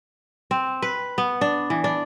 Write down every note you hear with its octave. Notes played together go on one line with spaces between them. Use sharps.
C4
B4
B3
D4
E3
D4